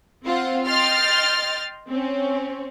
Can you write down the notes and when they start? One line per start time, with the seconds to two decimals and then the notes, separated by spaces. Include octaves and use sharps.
0.25 C4 F4 C5 F#5
0.65 D#5 G5 C6 F6 A6
1.89 C4 C#4